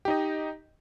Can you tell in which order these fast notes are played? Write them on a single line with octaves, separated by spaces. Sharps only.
G4 D#4 D#5